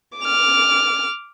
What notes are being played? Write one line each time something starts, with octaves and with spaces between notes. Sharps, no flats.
D6 F6